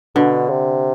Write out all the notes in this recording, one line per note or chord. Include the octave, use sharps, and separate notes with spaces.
B2 D3
C3